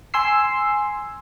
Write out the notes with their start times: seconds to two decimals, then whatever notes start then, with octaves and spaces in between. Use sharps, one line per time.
0.14 G#5 C6 E6 C7